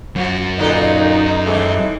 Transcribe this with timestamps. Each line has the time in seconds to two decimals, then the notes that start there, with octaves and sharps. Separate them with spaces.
0.16 F#2 F3 F#4
0.59 A#2 D3 D#4 A4 B4
1.46 D#2 G#2 E3 G#3 A3